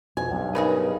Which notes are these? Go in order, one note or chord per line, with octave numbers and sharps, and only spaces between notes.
F2 B2 G#5
B1 G2
C#3 D#4 G#4 A#4 B4